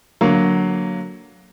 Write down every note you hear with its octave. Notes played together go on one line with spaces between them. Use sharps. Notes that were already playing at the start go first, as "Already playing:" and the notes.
D3 F#3 A#3